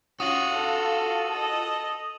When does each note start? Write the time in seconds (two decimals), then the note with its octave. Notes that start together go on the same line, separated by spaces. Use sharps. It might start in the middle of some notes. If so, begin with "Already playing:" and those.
0.20 C#4 F4 F#4 D#6 D#7 F#7
0.52 A4 F5
1.32 A4 D#5